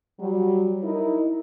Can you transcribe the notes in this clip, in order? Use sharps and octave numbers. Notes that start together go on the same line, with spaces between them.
F#3 G3
D#4 E4 A#4